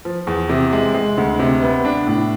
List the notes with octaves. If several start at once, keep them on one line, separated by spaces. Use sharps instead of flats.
F3
E2
C3
G#3
G#3
D2
C3
B3
D4
A2